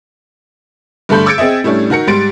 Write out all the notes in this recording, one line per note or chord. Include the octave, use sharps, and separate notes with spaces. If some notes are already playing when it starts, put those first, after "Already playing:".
G2 D3 A3 A4 B5 G6
D6 E6 G#6 A6 C#7 D7
C4 G#4 D#5 E5
A2 G3 A3 C#4 D4
D#3 F#4 A#4 C#7
G#2 G3 C6 A6 D7